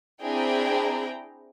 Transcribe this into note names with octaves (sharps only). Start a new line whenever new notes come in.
C4 D4 E4 G#4 G5 A#5